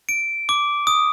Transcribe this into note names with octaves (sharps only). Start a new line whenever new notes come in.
D7
D6
D#6